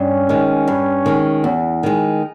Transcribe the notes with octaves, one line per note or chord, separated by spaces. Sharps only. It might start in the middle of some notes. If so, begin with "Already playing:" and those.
Already playing: G2 C#4
D#3 G#3
G2
D#3 G#3
E2
D#3 G#3